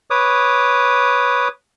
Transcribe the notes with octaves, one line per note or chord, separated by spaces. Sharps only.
B4 C#5 D6 D#6